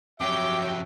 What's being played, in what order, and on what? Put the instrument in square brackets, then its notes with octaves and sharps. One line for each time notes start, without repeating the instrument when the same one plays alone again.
[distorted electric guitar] F2 F#3 [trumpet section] F#4 E5 [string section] G4 C#5 G5 [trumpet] D6